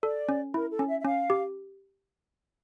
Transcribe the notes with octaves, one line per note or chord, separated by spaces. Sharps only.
A4 D5
C#4
E4 A#4
A4
C#4
E5
E5
C#4 F5
G4